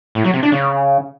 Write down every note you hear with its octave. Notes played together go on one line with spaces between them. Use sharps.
A2
F#3
C3
D4
C#3